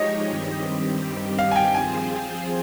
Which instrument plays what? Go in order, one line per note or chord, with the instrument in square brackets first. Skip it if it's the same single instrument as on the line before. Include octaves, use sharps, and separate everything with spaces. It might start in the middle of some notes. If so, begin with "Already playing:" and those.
Already playing: [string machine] F3 G#3 D#4 G4 C#5 [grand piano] D#5
[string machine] G2 D#3 G3 C4 G4
[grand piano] F5
G#5
G5
[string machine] F3 C4 F4 G#4 C5 [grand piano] G#5